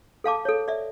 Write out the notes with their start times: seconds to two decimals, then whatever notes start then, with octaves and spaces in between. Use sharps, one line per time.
0.24 A4 F5 A5 D6
0.45 A4 C#5
0.68 D5 E5